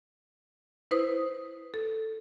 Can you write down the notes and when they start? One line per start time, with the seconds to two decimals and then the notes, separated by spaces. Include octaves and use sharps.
0.91 E4 B4 C5 D#6
1.74 A4